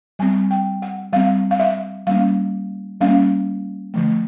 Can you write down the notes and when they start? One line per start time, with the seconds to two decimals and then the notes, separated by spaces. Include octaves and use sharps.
0.19 G3 C4 G#5
0.51 G5
0.82 F#5
1.13 G3 C4 F5
1.51 F5
1.60 E5
2.07 G3 A#3 C#4 F5
3.01 G3 A#3 C#4 F5
3.94 D3 F3 A3